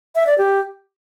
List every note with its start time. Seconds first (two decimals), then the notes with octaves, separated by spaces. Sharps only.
0.15 E5
0.27 D5
0.38 G4